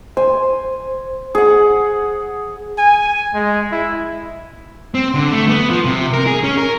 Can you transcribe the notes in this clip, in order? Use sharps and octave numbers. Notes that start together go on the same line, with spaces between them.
C5 G#5
G#4 F#5
G#5
G#3
E4
C4
D3
A3
B3
F3
C3
A#4
G#4
C#4
A#4